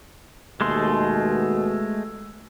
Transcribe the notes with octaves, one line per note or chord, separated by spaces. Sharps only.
D#2 B2 G#3 A3 C6